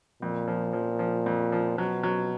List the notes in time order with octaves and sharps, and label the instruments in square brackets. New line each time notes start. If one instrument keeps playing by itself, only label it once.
[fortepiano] F2 [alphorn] A#2
[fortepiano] F3
F3
F3
F2
F3
[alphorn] B2 [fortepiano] F#3
[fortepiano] F#3